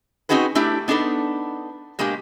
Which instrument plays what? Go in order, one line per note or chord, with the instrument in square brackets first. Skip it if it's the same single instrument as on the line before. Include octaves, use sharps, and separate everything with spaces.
[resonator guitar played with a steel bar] C4 C#4 D#4 F#4 G#4 B4
A3 D4 E4 G4
B3 D4 D#4 A4 B4
B2 G#3 A#3 D4 G4